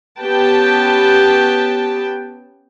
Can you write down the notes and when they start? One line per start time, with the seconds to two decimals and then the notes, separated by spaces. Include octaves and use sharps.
0.19 B3 C#4 G4 B4 G5 A5